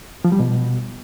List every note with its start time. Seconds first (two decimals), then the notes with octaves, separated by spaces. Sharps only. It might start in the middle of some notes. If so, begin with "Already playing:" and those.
0.25 F3
0.32 G3
0.40 B2